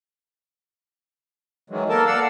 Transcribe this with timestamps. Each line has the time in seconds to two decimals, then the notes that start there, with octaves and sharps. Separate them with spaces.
1.70 D#3 E3 F#3 G#3
1.89 A#3 B3 A4 A#4 A5
2.07 D5 F5 F#5 E6